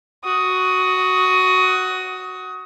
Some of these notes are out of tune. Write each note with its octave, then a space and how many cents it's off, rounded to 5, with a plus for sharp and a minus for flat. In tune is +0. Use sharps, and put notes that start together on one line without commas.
F#4 +5 D#6 +20